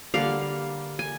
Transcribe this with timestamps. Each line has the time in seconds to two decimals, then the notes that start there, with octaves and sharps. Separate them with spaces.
0.14 D3 G3 A#3 F5
0.99 G#5